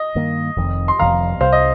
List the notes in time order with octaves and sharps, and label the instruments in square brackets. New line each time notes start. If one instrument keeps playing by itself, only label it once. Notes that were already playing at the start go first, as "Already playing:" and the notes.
Already playing: [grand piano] D#5
[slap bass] G2 D#3 A#3
F1 F2 D#3
[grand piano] C6
[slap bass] F1 F2 D#3 [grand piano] F5 A#5
[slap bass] C2 C3 G3 [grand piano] C5 F5
[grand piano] D#5